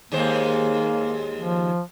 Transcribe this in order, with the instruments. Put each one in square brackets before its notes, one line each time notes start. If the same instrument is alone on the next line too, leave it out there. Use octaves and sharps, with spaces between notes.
[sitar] D#2 G#3 C5 [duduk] A#3
[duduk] F3